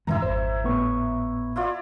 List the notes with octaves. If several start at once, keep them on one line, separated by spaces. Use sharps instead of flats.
G2 E3 G#3 E4 E5 A#5
G#1 F2 C5
A2 B3 C#6
E4 F4 D5